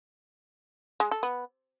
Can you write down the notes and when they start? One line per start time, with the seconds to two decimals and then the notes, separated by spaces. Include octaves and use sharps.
1.00 G#3
1.11 A4
1.23 B3